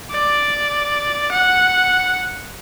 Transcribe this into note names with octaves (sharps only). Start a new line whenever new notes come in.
D5
F#5